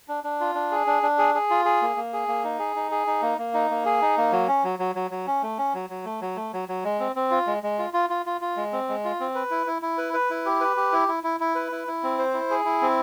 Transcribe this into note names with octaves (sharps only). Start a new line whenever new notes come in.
D4
D4
F4
D4
G#4
D4
D4
G#4
G#4
F4
G#4
A#3
A#3
G#4
A#3
D#4
G#4
D#4
G#4
D#4
A#3
A#3
D#4
A#3
G#4
D#4
A#3
F#3
C#4
F#3
F#3
F#3
F#3
C#4
A3
C#4
F#3
F#3
A3
F#3
A3
F#3
F#3
G#3
C4
C4
F4
G#3
G#3
F4
F4
F4
F4
F4
G#3
C4
G#3
F4
C4
B4
E4
E4
E4
B4
B4
E4
G4
B4
G4
E4
E4
E4
E4
B4
E4
E4
C4
C5
E4
G#4
E4
C4